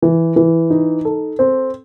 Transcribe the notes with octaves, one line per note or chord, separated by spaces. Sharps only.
E3
E3
D#4
A4
C4